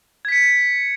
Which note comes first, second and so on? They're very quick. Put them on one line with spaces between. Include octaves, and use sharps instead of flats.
G#6 B6 C#7